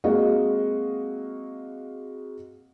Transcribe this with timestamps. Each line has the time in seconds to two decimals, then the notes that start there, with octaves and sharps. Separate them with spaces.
0.04 G#3 A#3 C4 F#4 D#5 F5